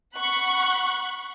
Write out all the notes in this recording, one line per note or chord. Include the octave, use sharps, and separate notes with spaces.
F#5 B5 C#6 F#6